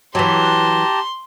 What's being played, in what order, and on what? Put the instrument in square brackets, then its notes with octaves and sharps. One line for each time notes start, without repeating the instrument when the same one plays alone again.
[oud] E3 F#3 [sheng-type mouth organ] G4 A5 A#5 [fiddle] C6